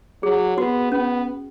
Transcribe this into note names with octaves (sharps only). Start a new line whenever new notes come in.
F#3 G#4
B3 F#4
B3 C#4